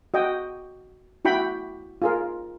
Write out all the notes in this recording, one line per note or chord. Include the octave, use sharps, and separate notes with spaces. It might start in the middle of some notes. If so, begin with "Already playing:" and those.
F#4 D#5 G5
E4 F#4 G5 B5
F4 G#4 A#4